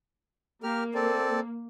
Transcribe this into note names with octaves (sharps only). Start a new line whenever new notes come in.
A#3 G4 A#4 F6
C4 A4 D5